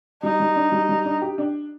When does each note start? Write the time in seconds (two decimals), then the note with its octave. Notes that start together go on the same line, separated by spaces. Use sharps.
0.23 G3 D#4
0.40 G3
0.56 D4
0.72 G3
0.89 G3
1.05 D4
1.22 G4
1.38 D4